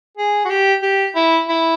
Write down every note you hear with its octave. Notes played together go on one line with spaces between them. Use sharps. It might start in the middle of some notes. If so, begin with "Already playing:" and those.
G#4
F#4
G4
G4
E4
E4